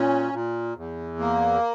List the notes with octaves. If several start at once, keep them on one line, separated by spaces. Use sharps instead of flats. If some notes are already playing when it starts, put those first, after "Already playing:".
Already playing: A#2 C#4
A#2
E2
A#3